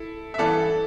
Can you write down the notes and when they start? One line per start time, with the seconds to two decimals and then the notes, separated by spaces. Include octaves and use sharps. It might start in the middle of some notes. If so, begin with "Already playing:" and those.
Already playing: E4 A4
0.34 E5
0.38 G2 E3 B3 A4 D5